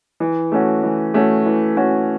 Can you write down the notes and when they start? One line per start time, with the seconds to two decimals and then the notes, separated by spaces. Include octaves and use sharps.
0.20 E3
0.52 A3 C#4 F#4
0.83 E3
1.14 A3 C#4 F#4
1.46 E3
1.77 A3 C#4 F#4